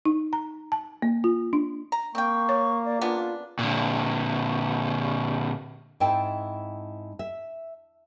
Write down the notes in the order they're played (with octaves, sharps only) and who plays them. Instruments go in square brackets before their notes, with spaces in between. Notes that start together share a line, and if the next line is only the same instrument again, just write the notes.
[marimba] D#4
A#5
A5
A#3
F4
D4
[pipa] A#5
[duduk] A#3 [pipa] C4 G5 [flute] C#6
[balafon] C#5
[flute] D5
[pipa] C#3 B3 D4 [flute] F4
[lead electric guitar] A#2 D3
[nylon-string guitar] G#2 C4 E4 G5 A5
E5